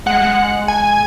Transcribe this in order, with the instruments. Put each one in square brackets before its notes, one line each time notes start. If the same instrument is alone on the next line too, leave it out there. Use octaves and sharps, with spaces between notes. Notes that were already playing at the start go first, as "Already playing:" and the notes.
[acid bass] G#3 [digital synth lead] F#5
[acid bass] G#3
[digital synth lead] G#5